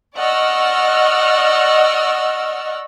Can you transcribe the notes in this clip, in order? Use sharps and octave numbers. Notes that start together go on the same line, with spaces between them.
D5 D#5 F#5 C#6 E6 F6